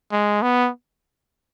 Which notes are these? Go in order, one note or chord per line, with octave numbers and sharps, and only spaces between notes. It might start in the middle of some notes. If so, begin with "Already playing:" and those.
G#3
B3